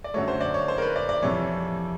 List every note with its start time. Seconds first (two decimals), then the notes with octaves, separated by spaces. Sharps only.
0.04 D5
0.14 F#2 D3 F#3 A3 C#5
0.28 C5
0.41 D5
0.54 C#5
0.68 C5
0.78 A#4
0.82 B4
0.96 D5
1.09 D5
1.22 F2 C3 E3 C#5